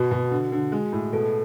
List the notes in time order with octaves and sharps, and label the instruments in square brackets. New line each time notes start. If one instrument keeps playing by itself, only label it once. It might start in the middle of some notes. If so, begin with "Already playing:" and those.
Already playing: [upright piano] B2 [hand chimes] F#4
[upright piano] B2
D3
D3
G#3
A2
[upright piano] B2 [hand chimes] A4